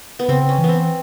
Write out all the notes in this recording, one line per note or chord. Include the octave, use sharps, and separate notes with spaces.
B3
C#3 C4
C#4
E3
B3 C4